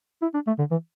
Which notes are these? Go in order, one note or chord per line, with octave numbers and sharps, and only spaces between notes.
E4
D4
A3
D3
E3